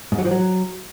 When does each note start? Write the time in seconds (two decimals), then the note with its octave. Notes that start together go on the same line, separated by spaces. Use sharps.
0.12 G#2
0.18 F#3
0.25 F3
0.31 F#3